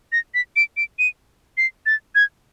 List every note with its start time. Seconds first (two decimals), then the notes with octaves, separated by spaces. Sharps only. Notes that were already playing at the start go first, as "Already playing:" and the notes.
0.12 A#6
0.34 B6
0.56 D7
0.77 D7
0.99 D#7
1.57 C7
1.86 A6
2.15 G#6